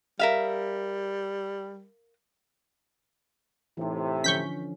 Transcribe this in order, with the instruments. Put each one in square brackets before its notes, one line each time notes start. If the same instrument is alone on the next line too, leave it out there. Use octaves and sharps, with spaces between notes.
[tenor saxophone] G3 [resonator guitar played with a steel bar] A#4 E5 F5
[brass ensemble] A2 C3 [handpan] E3 D#4
[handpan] D3 F3 C#4 [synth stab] C#6 G6 B6